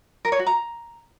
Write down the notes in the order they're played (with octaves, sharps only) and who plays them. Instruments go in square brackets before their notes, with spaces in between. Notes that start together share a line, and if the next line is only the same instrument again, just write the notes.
[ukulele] A#4
C#5
F#4
A#5